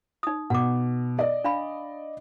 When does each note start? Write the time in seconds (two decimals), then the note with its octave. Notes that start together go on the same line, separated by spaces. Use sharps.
0.23 D#4 D#6
0.50 B2 F#5 D6
1.19 D5 D#5
1.44 D4 F5 B5